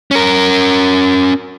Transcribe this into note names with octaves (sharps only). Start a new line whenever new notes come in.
C#4 A#4